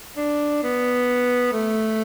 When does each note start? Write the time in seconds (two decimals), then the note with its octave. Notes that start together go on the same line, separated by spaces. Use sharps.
0.17 D4
0.63 B3
1.52 A3